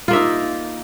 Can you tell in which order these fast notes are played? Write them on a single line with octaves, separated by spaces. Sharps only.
F4 A#3 E5 D#4